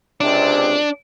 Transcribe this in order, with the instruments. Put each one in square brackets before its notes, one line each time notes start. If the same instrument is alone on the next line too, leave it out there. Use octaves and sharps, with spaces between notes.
[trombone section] C#2 C3 [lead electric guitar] D4